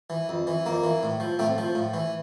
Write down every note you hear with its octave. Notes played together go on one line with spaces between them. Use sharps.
E3
F2
E3
F2 A#3
E3
A2
F3
A2 A3 C4
F3
A2
E3